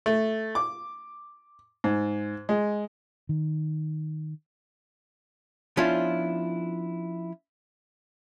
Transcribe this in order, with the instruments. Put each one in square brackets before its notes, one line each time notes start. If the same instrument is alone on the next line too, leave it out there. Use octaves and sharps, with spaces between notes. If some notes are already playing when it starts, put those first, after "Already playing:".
[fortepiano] A3
D6
G#2
G#3
[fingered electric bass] D#3
[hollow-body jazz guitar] F3 B3 C#4 D4 E4 F4